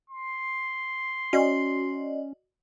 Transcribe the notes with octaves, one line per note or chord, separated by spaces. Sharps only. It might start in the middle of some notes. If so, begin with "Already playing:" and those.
C6
C#4 F#4 D5 D#5